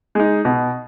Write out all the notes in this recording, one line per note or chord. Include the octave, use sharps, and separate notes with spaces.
G#3 D#4
B2